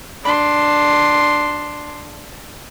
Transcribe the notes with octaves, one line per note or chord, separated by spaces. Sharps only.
D4 C6